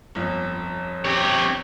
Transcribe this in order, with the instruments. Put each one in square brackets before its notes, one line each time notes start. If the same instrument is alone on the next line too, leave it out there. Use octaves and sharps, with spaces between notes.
[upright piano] G1 F2
[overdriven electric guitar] C4 C#5 [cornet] G4